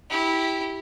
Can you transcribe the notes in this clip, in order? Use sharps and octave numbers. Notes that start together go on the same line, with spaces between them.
E4 G4